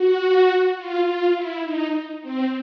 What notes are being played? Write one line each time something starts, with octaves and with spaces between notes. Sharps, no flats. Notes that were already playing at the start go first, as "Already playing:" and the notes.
Already playing: F#4
F4
F4
E4
D#4
C4